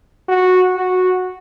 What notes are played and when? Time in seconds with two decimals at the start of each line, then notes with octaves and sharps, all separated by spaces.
0.29 F#4
0.77 F#4